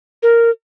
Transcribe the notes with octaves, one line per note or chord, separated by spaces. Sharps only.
A#4